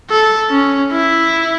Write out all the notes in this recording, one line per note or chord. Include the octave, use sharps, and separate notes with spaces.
A4
C#4
E4